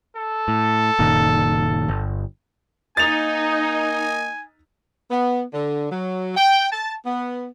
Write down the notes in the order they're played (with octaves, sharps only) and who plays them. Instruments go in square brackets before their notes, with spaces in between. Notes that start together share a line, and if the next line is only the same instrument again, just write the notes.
[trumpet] A4
[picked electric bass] A2
F#1 A#2 D#3
G1
[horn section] A#3 D#5 [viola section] D#4 [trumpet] G#5 [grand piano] A6 F7
[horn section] B3
D3
F#3
G5
A5
B3